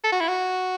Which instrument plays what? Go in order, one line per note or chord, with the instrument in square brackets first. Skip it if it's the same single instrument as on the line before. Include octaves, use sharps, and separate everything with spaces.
[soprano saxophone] A4
F#4
E4
F#4